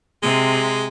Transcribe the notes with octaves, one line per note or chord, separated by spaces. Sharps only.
C3 G#3